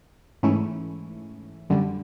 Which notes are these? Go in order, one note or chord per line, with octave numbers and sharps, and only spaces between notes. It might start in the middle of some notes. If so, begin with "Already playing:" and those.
G#2 E3 A3 C#4 E4
F#2 D3 G3